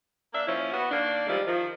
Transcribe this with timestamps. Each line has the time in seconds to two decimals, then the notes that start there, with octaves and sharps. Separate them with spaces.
0.33 A#3 D4 E5
0.47 A#2 F3 C#4 E4
0.72 B3 F#4
0.90 D#3 A#3 D4
1.26 D#3 F3 G3 G#3 E4
1.46 D#3 F3